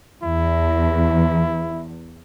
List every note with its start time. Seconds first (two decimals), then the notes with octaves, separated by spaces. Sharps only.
0.23 E2 E4